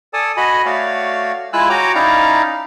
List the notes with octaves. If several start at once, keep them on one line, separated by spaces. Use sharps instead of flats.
A4 D5 G#5 A5 D#6
F#4 D#5 G#5 B5
A3 F#4 C#5 D5 F5
G#3 E4 F4 G#5 E6 F#6
F#4 C#5 G5 A#5 D6
C#4 D#4 E4 D5 F5 A#5